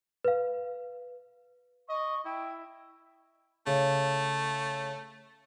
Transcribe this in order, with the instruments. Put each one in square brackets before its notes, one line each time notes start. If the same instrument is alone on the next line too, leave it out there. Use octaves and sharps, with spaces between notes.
[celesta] B4 F5
[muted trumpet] D#5 [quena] C#6
[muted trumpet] E4 [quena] G5
[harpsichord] C#3 [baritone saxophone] A3